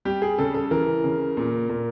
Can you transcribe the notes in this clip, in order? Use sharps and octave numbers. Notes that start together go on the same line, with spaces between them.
G3 G4
G#4
C#3 A4
A4
E3 A#4
C#3
A#2
A#2